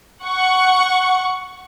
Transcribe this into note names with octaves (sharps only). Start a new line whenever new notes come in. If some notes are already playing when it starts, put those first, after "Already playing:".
F#5 C#6